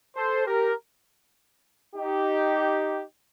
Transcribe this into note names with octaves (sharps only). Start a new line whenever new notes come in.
A4 C5
G4 A#4
D#4 G4